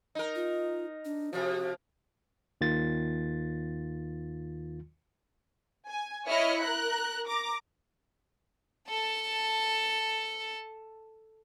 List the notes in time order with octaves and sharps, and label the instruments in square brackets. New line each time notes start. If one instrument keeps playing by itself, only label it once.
[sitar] D#4 A#4
[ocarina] F4
D4
[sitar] C3 F3 [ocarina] F#4
[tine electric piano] D#2 D#3 F4 A6
[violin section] G#5
E4 C#5 D#5 F6 C#7
A#4 A#5 F#6
A#5 D6
[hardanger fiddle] A4 A5